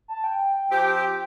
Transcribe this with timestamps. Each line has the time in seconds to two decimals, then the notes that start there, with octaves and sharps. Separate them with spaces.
0.08 A5
0.24 G5
0.71 F3 C4 G4